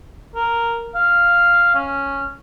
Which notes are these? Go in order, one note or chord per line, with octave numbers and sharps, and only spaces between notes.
A#4
F5
C#4